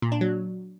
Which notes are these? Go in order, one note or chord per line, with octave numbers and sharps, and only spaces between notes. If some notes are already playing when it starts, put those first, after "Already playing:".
A#2
D4
F#3